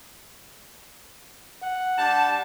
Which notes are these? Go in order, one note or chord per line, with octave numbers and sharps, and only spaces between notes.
F#5
G3 D4 A5